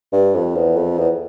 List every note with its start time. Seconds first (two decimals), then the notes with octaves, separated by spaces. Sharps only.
0.12 G2
0.35 F2
0.55 E2
0.76 F2
0.98 E2